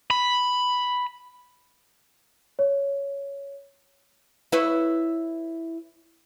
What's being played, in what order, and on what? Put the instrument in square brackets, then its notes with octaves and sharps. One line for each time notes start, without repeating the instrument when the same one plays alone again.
[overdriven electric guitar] B5
[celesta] C#5
[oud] E4 B4 C#5